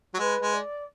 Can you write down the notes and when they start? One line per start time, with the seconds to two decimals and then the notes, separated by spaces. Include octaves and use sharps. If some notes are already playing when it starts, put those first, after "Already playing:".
0.14 F#3
0.19 G#3 B4
0.42 G#3
0.53 D5